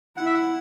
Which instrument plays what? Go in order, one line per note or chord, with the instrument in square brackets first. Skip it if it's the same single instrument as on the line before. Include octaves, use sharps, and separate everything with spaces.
[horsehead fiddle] E4 [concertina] F#5
[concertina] E5
F#5